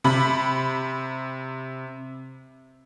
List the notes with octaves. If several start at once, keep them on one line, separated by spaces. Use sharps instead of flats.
C3 B5